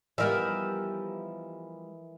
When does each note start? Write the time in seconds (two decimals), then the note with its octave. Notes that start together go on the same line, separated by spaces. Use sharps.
0.18 E3 F3 G3 B3 A#4 D#5 E5